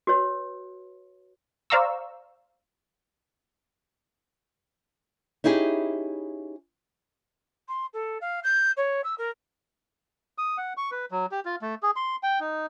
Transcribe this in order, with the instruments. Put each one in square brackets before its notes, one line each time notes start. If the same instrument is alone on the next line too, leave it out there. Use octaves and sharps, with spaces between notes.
[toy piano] F#4 B4 C#5
[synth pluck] C5 D5 F5 A#5 C#6 E6
[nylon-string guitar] C#4 D#4 E4 G4 G#4
[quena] C6
A4
F5
G6
C#5
E6
A#4
[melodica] D#6
F#5
C#6
B4
F#3
G4
F4
A3
G#4
C6
G5
D#4